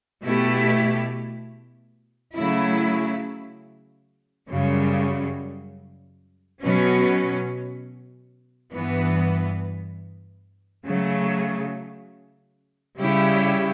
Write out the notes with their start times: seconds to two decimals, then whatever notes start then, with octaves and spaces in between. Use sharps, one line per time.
0.24 B2 A3 E4 G4
2.36 C#3 F#3 A3 E4
4.49 F#2 C#3 G3
6.61 B2 F#3 C#4
8.73 G2 E3 B3
10.86 C#3 F#3 A3
12.98 C#3 G3 C#4 E4 G4